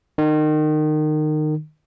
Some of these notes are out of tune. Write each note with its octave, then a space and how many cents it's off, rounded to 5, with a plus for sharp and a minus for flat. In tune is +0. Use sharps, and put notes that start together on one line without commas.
D#3 -25